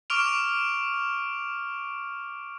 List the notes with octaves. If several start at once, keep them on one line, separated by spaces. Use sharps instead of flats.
C#6 D6 F6 D7 F7